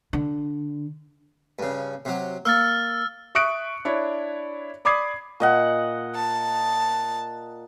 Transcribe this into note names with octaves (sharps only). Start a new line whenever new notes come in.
D3
G2 C#3
C3 F#3
A#3 E6 F6 A6
E5 C#6 D#6 F#6 C#7 D7
D4 E4 C#5
D5 B5 D6 D#6 G#6 C7
A#2 D#5 F#5
A5